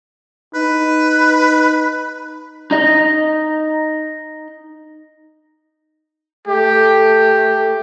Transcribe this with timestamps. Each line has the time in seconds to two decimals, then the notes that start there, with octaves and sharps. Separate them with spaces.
0.55 D#4 B4
2.71 D#4 D#5
6.48 A3 G4